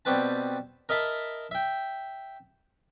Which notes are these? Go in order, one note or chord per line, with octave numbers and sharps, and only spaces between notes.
B2 G3 C4 B4 A5
A#4 D#5 E5 A5 B5
E5 G5